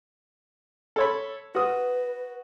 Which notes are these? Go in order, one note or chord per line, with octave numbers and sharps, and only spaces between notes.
A4 C#5 B5
F#4 B4 D#6